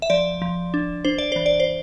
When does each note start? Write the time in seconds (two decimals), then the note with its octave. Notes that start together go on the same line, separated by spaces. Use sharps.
0.02 E5
0.10 F3 D5
0.42 F3
0.74 D4
1.05 D4 C5
1.18 D5
1.32 E3 C5
1.46 D5
1.60 C5